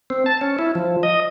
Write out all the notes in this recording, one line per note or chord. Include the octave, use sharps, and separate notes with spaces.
C4
A5
C#4
E4
F3
D#5